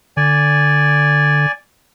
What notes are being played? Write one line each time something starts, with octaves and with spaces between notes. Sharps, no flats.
D3 D5 G#5